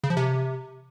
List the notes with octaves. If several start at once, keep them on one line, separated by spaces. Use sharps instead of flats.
C#3
F3
C3